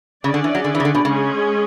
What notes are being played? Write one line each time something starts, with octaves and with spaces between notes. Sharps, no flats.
C#3 C#4 G#4 D5
D3
E3
F#3
D3
E3
C#3
D3
B2
C#3 G#3 C#4 G#4